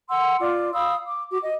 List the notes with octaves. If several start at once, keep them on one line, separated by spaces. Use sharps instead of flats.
F#5 C6 E6
F4 D5 D6
F5 B5 D#6 E6
D6
F#4 D6
D#5